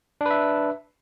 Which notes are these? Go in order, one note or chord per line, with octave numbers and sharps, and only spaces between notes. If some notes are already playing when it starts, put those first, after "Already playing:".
D4 B4 E5